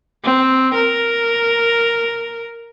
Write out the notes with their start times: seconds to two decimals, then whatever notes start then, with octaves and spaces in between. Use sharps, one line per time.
0.24 C4
0.74 A#4